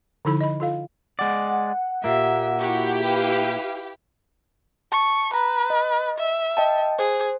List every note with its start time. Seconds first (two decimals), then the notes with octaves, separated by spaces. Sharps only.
0.25 D3 F3 D#4 E4 A4 B5
0.41 D#5 B5
0.60 F4 A4 F5
1.19 G#3 D5 F#5
2.04 A#2 A#3 G4 E5
2.59 E4 F#4 G4
3.04 B4 F5
4.92 A5 C#6
5.34 B4 A#5
5.70 D#5
6.18 E5
6.57 D#5 G5 A5
6.99 G#4 C5